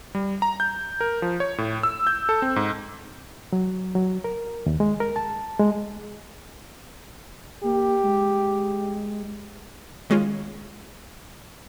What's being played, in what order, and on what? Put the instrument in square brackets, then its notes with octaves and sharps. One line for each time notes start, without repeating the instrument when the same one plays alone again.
[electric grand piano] G3
A#5
G6
A#4
F3
C#5
A2
E6
G6
A4
C4
G#2
[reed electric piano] F#3
F#3
A#4
D#2
G#3
A#4
A5
G#3
[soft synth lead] A#3 [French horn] G4
[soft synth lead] G#3
[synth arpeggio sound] D#3 G#3 C#4 F4